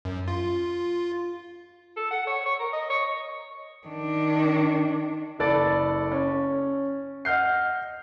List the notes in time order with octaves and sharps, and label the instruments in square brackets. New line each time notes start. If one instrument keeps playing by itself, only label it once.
[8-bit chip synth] F#2
F4
[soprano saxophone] A4
F#5
C#5
C#5
A#4
D#5
C#5
[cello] D#3 D4
[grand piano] F#1 A4 D5 B5 A6
C#4
D#5 F#5 F6 G6 C7